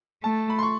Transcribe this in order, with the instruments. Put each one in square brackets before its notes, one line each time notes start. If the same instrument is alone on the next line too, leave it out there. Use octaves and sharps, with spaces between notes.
[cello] A3 [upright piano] A5
[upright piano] B5
C6
C#6